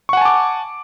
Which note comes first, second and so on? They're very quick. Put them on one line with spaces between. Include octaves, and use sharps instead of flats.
C#6 F#5 G#5 A5 D6